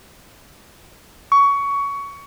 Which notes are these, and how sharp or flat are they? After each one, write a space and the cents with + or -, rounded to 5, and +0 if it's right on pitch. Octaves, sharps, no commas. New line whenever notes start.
C#6 +20